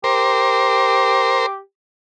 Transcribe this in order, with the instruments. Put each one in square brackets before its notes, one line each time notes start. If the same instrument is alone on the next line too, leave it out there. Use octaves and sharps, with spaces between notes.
[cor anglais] G4 [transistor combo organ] A#4 C5